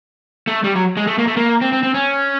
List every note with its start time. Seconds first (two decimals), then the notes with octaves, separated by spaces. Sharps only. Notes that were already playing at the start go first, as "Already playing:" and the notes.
0.47 A3
0.64 G3
0.75 F#3
0.97 G#3
1.07 A3
1.18 A#3
1.27 A3
1.37 A#3
1.61 C4
1.73 C4
1.83 C4
1.94 C#4